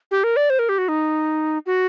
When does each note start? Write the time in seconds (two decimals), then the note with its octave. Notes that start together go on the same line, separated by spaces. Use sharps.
0.11 G4
0.24 A#4
0.36 D5
0.50 C5
0.59 A#4
0.69 G4
0.78 F#4
0.88 D#4
1.66 F#4